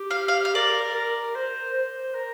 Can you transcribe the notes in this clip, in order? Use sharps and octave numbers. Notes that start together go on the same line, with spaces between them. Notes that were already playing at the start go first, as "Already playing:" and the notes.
Already playing: G4
F5
F5
F5
A#4 D5
A#4
C5
C5
A#4